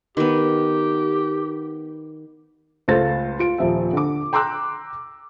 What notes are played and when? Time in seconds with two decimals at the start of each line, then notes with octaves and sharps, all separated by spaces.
0.17 D#3 B3 G4
2.88 C#2 A3 F4 C5 F5 A6
3.39 F4 D7
3.58 D#1 F3 E5
3.93 D3 D6
4.33 G5 A#5 C6 D6 E6 F#6